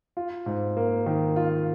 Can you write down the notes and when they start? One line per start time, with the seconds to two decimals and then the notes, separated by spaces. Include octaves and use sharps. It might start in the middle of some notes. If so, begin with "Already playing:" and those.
0.17 F4
0.46 G#2
0.77 A#3
1.06 D#3
1.36 F4